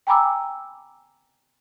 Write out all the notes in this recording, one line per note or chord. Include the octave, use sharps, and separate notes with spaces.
G5 G#5 A#5 B5 D6 E6